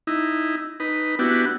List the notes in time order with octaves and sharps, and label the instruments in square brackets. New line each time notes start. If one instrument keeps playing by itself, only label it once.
[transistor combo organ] D#4 E4
D#4 B4
B3 D4 E4 F#4 G4